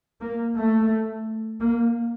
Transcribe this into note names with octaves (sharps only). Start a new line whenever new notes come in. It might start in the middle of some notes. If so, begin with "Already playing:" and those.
A#3
A3
A#3